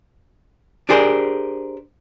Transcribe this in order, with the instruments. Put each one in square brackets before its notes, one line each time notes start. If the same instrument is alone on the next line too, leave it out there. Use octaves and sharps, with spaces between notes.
[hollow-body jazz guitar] D4 G4 G#4 A#4 C5